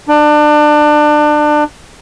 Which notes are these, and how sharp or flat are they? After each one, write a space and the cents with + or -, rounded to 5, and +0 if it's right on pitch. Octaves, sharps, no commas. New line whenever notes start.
D4 +25